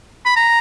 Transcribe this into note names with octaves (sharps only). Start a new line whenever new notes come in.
B5
A#5